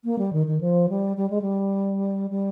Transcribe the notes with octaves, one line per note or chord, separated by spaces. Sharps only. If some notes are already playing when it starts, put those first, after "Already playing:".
A#3
G3
D#3
D#3
F3
G3
G3
G#3
G3
G3